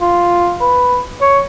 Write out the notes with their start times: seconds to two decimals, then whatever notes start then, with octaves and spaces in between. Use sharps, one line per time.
0.01 F4
0.61 B4
1.21 C#5